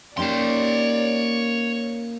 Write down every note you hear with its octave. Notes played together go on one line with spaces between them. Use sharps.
A#3 C#4 D#4 G4 C#5 D5 C6